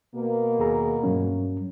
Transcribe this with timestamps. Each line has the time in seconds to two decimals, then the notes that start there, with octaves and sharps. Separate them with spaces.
0.15 B2 A#3
0.59 D#2 G#4 A#5
1.04 G2 F#3 C#4